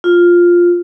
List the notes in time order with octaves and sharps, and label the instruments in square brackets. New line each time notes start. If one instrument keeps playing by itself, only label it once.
[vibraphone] F4